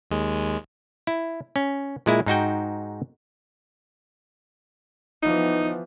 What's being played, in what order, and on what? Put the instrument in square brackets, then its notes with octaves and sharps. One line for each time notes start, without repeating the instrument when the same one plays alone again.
[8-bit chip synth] D#2 G#3
[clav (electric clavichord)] E4
C#4
A#2 G#3 E4
G#2 D#4 F#4 G5
[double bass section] E3 F3 B3 [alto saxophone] D#4